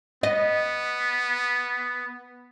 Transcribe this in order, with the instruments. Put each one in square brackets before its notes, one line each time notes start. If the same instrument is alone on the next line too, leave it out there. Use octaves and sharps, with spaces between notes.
[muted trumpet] B3 [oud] D#5